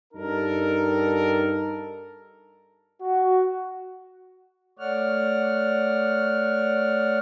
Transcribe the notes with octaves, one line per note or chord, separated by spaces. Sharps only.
G2 D#4 A4 A#4
F#4
A3 C#5 D5 F#5 F6